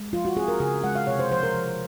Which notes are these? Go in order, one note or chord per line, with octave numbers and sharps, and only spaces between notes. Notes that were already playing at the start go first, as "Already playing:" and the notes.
Already playing: G#3
F3 F4
F#4
C4 G#4
A#4
C#3 G#4
G#3 F#5
F5
C3 C#5
C5
F3 C5
A#4
F3